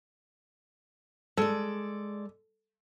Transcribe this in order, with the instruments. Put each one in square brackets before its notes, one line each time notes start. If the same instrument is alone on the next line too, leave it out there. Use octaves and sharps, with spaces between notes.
[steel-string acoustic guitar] G#3 D5 [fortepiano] A4